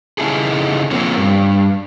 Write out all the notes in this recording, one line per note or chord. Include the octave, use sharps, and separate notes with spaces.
C#3 C#4 D#4 E4 G#4 A4
F3 A#3 C4 C#4
G2